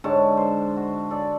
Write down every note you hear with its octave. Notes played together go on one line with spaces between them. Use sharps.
G#2 D3 C#5 A5
C5
F#4
A4 D5